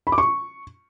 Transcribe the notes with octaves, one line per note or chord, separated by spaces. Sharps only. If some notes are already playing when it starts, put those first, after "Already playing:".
B5
D6
C#6